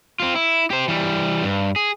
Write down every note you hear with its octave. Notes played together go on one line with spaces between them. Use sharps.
C4 F4
E4
G4 C5
E3 G3
G2
G#4